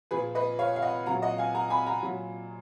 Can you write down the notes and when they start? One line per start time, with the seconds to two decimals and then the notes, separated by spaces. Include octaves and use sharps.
0.11 A#2 F3 G#4 B4
0.35 B4 D#5
0.59 C#5 F5
0.76 F5
0.82 D#5 F#5
1.06 A#2 F#3 F#5 A#5
1.22 D#5 F#5
1.38 F5 G#5
1.55 F#5 A#5
1.70 G#5 B5
1.86 F#5 A#5
2.02 A#2 F#3